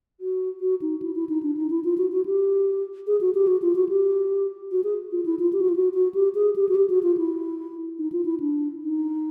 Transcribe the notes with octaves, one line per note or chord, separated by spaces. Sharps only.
F#4
F#4
D#4
E4
E4
D#4
D4
D#4
E4
F4
F#4
F#4
G4
G#4
F#4
G4
F#4
F4
F#4
G4
F#4
G#4
F4
E4
F4
G4
F#4
F4
F#4
F#4
G4
G#4
G4
F#4
G4
F#4
F4
E4
D#4
F4
E4
D4
D#4